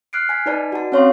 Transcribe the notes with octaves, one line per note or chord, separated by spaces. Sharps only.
F6 F#6 C7 D7
G#5 B6
D#4 B4 D5 A5
F#4 A5
C4 C#4 C#5 F5 C6